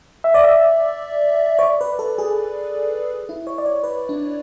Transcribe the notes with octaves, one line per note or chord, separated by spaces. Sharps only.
E5
D5
E5
C#5
D5
B4
A4
G#4
E4
C#5
D5
C#5
B4
D4